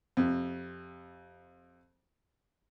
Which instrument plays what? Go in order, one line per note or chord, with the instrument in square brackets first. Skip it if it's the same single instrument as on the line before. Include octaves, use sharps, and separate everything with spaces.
[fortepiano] F2 C3